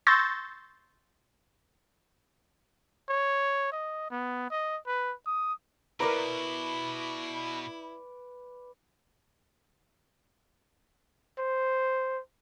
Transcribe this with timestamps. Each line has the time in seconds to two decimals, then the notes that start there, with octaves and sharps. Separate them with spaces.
0.07 C6 C#6 E6 G6 A6 A#6
3.09 C#5
3.72 D#5
4.11 B3
4.51 D#5
4.87 B4
5.26 D#6
6.00 B2 E4 A#4 B4 D5 A#5
11.39 C5